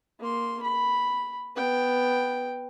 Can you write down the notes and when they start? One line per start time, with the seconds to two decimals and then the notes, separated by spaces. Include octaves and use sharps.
0.20 A#3 C6
0.63 B5
1.56 B3 G5